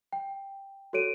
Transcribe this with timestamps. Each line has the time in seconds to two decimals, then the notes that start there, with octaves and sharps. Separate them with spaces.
0.13 G5
0.93 F#4 A4 C#5 D7 D#7